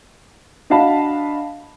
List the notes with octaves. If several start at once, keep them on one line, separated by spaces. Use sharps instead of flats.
D4 F#4 D#5 F5 A5 B5